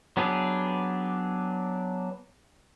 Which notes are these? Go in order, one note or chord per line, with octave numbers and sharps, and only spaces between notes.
F#3 B3 D4 G4 G#4